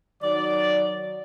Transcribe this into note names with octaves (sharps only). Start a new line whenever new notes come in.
D#3 F#3 D5